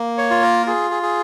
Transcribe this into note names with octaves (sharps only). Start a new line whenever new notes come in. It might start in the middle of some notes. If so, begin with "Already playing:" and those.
Already playing: A#3
C#5
F4
A#4
F4 G#4
G#4
G#4